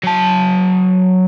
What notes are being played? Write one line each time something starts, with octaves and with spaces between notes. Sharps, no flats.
F#3 A5